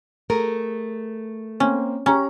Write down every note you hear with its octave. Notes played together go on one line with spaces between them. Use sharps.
A3 G#4 A#4
A#3 C4 C#4
C#4 G4 A#5 C#6